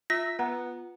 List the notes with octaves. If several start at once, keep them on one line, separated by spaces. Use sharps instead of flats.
F4 E5 A#6
B3 F#5 A#5